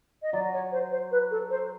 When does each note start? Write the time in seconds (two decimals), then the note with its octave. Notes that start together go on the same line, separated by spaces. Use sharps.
0.23 D#5
0.33 F#3 D5
0.53 C#5
0.72 C5
0.91 C5
1.11 B4
1.31 A4
1.51 C5